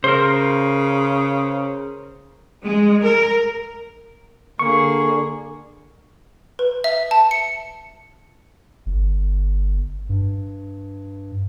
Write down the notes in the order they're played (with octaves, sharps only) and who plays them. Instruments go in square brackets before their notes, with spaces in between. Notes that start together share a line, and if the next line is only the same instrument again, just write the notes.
[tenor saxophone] C#3 [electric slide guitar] A#4 C5
[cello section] G#3
A#4
[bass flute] D3 [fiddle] A#3 G#4 [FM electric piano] C#6
[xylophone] B4
E5
A5
C#7
[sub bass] G1
G2